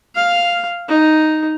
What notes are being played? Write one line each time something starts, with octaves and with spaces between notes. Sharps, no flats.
F5
D#4